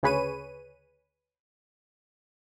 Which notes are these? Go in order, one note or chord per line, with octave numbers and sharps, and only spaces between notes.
D2 C#3 G#4 B4 C#5 D#7